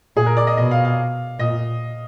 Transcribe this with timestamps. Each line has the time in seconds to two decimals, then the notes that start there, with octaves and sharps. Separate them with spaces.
0.16 A#2 G#4
0.26 A#4
0.37 D5
0.47 D#5
0.57 B2 D#5
0.71 F5
0.85 F5
1.39 A#2 D#5